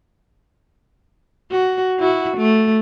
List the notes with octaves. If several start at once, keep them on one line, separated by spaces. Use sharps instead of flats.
F#4
E4 F#4
A3